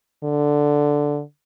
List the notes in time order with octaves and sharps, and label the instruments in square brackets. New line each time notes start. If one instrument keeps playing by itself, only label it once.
[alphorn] D3